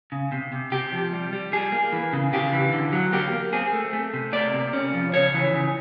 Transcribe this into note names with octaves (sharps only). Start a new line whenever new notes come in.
C#3
C3
C3
C3 G4
F3
G3
G3
G3 G#4
A#3
E3
C#3
C#3 G4
E3
D3
F#3
A#3 G4
A#3
C4 G#4
A3
A3
C3
A#3 D5
C3
C#4
F3
C#3 C#5
E3
C#3